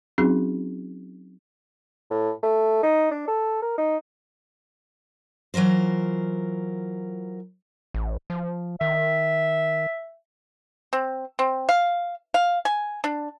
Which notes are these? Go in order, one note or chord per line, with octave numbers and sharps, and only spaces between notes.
F#3 C4 C#4 D#4 F#4 G#4
A2
A3
D#4
D4
A4
A#4
D#4
E3 F#3 F4 A#4 C5
A1
F3
D#3 E5
C4
C4
F5
F5
G#5
D4